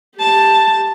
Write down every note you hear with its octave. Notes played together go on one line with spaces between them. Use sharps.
G4 A5